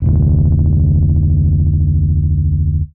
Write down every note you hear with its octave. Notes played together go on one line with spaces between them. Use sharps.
F1 D2